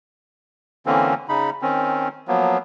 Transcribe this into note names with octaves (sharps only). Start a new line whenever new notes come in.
D3 E3 A#3 C4 C#4
C#3 D#4 B5
D#3 C4 C#4
F3 F#3 A#3 B3